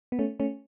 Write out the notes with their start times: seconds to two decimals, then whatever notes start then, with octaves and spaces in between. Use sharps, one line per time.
0.12 B3
0.19 A3 C#4
0.40 A3 C#4